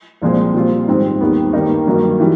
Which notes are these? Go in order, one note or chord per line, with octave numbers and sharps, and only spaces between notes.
C2 A#2 F3 G#3 C4
A#2 G3 C4 F4
G#2 D#3 G3 C4
D#2 D#3 G3 B3
G2 D#3 G3 A#3 D#4
G2 D#3 F#3 A#3
E3 G3